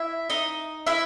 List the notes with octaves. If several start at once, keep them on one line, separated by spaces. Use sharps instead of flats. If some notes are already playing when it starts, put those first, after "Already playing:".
Already playing: E4 E5
D#4 D#5
E4 E5